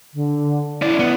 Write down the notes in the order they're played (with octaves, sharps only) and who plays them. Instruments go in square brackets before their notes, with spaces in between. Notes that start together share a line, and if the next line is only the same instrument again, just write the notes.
[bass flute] D3
[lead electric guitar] C#4 D5 [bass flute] E4
[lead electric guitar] B3